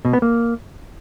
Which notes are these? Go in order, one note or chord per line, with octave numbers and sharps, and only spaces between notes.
B2
B3
A#3